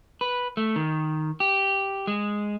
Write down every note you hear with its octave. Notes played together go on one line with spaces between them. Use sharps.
B4
A3
D#3
G4
G#3